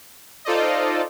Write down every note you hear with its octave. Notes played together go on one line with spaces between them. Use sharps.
D#4 F4 A4 C5 D5 D#5